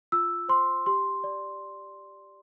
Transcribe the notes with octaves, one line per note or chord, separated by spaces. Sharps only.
F4 E6
C5 C6
G4 C6
D5